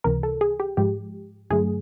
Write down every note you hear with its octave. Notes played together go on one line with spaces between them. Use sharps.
C#2 C3 E3 A#4
A4
G#4
G4
G#2 F3 G#3 G4
G2 D3 F#3 A3 G#4